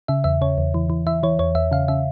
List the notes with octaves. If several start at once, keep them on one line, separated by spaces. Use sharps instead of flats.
C#3 E5
E2 E5
C#3 C#5
E2
E3
E3
E3 E5
E3 C#5
E2 C#5
E2 E5
C#3 F5
C#3 E5